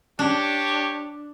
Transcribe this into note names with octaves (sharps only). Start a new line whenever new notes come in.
D4 G4 C#5 A5